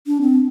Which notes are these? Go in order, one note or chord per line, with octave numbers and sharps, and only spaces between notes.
D4
C4